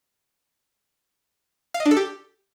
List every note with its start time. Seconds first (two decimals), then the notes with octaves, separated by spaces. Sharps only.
1.74 F5
1.80 D#5
1.85 D4
1.91 A4
1.97 G4